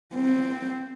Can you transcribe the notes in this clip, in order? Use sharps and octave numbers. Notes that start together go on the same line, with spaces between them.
C4